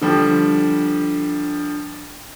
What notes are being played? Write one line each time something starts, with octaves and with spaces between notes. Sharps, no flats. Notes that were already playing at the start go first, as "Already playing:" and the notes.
D3 F3 G3